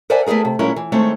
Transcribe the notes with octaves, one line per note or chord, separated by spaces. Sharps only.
A#4 C5 D5 E5 F#5 G#5
A3 B3 E4 G#4 A#4
C3
A#2 F#3 G#3 C#4 E4 A#4
E3
D#3 G#3 A3 C4 C#5